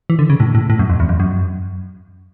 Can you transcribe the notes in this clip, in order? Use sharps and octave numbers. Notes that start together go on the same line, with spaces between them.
E3
D3
C#3
A2
A2
A2
F#2
F2
E2
F2
F#2